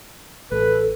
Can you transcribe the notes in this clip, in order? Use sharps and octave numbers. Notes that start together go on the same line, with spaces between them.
A1 A4 B4